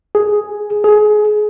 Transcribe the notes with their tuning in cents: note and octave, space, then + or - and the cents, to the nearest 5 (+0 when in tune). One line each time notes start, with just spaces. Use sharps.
G#4 +5
G#4 +25